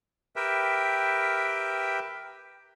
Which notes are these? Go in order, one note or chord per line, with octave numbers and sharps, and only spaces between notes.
G4 A#4 B4 E5 G5